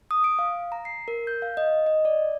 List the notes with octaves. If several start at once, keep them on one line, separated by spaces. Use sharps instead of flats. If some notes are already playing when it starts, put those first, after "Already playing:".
D#6
D7
F5
A#5
C7
A#4
G6
F5
D#5
D#5
D5